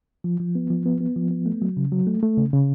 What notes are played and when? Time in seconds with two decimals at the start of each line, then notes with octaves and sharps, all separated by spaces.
0.24 F3
0.40 F3
0.55 B3
0.70 F3
0.86 B3
1.01 B3
1.16 F3
1.31 B3
1.46 A3
1.62 F#3
1.77 C#3
1.92 F#3
2.07 A3
2.23 A3
2.38 C#3
2.53 C#3